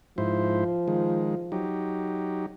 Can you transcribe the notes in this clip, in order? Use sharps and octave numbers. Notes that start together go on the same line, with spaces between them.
G#2 F3 E4 C5
D#3 G#3
F#3 D#4 G4